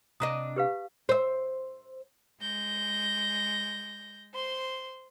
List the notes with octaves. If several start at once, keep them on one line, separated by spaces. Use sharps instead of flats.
C3 D4 D#5 A#5 D#6
G4 B4 F5
C5 E5
G#3 G6 A#6
C5 C6